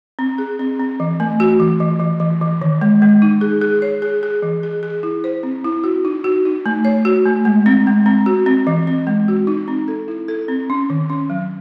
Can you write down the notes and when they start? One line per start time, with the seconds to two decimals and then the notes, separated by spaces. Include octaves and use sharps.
0.19 C4
0.38 G#4
0.59 C4
0.80 C4
1.00 E3
1.20 A3
1.40 F#4
1.60 E3
1.80 E3
2.00 E3
2.20 E3
2.41 E3
2.61 D#3
2.81 G#3
3.02 G#3
3.22 D#4
3.41 G#4
3.61 G#4
3.82 C#5
4.02 G#4
4.23 G#4
4.42 E3
4.63 G#4
4.83 G#4
5.03 E4
5.24 C5
5.43 C4
5.65 E4
5.84 F#4
6.05 D#4
6.24 F#4
6.45 D#4
6.66 A3
6.85 C#5
7.05 F#4
7.26 A3
7.45 G#3
7.66 C4
7.87 G#3
8.06 C4
8.26 F#4
8.46 C4
8.67 E3
8.87 C4
9.07 G#3
9.28 F#4
9.47 D#4
9.68 C4
9.88 A4
10.08 E4
10.28 A4
10.48 C4
10.70 C#4
10.90 D#3
11.10 C#4
11.30 F#3